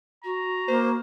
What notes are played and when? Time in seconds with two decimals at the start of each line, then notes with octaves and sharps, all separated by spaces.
0.24 F#4 A#5
0.68 A#3 C5